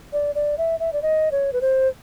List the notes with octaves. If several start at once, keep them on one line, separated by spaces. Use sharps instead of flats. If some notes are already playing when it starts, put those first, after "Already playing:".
D5
D5
E5
E5
D5
D#5
C#5
B4
C5